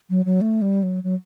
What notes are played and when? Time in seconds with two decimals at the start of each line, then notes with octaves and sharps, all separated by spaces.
0.10 F#3
0.25 F#3
0.41 A3
0.62 G3
0.83 F#3
1.04 F#3